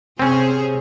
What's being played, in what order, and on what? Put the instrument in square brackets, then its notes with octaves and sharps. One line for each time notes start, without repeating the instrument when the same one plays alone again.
[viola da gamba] C3 [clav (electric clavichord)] C4 C#4 [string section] G#4 C5 C#5